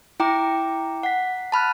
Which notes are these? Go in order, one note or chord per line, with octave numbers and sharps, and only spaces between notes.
E4 G5 A#5 D6
F#5 B6
A5 B5 F6 F#6